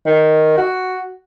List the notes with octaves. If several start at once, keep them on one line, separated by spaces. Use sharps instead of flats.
D#3
F#4